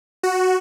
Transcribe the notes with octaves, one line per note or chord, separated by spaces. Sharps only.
F#4